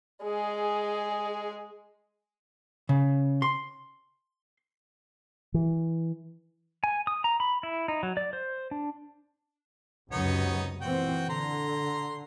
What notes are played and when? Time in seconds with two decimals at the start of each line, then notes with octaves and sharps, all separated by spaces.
0.23 G#3 G#4
2.89 C#3
3.42 C6
5.54 E3
6.84 G#5
7.07 D#6
7.24 A#5
7.40 B5
7.63 E4
7.88 D#4
8.03 F#3
8.17 D5
8.33 C5
8.71 D4
10.12 C#2 F#2 C3 B3 D#4 C#5
10.81 A#2 E3 C4 F#4 G5
11.29 D3 A#5 C6